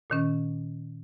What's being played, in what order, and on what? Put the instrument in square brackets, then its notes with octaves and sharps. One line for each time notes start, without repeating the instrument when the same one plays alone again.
[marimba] A#2 D#3 C#4